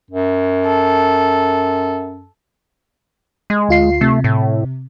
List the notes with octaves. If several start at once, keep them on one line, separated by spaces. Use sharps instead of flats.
F#2
A4
G#3
D2 F4 C7
C3 A3
A2